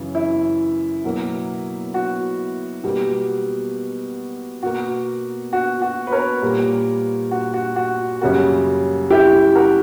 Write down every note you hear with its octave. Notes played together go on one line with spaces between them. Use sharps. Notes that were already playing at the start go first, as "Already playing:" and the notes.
Already playing: F#2 C#3 E3
E4
B2 F#3 A#3
F#4
B2 G3 A#3
B2 A#3 F#4
F#4
F#4
B4
A#4 C#5
A#2 G3 A#3
F#4
F#4
F#4
F#2 C#3 G3 A#3 F#4
E4 G4
F#4 A#4